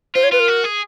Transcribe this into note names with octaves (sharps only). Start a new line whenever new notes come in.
F4 C5
C#5
F4 B4
A#4
F#4
G#4